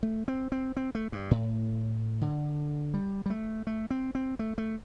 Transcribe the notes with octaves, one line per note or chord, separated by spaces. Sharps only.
A3
C4
C4
C4
A3
G2
A2
D3
G3
G3
A3
A3
C4
C4
A3
A3